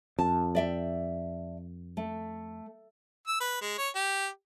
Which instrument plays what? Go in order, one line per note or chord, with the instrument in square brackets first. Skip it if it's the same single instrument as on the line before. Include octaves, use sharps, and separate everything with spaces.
[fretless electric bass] F2 [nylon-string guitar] A5
[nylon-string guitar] D5 E5 G5
A3
[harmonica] E6
B4
G#3
C#5
G4